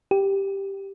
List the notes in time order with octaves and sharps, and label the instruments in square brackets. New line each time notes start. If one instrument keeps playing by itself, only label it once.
[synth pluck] G4